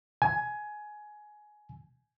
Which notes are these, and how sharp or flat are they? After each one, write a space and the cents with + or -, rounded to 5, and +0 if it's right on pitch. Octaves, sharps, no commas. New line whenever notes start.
G#5 +15